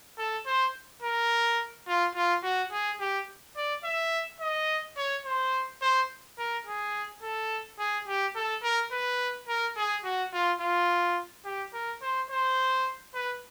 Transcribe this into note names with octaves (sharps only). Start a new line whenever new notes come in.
A4
C5
A#4
F4
F4
F#4
G#4
G4
D5
E5
D#5
C#5
C5
C5
A#4
G#4
A4
G#4
G4
A4
A#4
B4
A#4
G#4
F#4
F4
F4
G4
A#4
C5
C5
B4